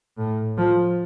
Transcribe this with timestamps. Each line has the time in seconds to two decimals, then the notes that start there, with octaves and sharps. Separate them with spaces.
0.18 A2
0.58 F3